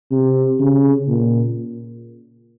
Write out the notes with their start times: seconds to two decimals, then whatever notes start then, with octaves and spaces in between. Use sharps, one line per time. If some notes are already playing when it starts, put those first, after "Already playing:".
0.11 C3
0.60 C#3
1.08 A#2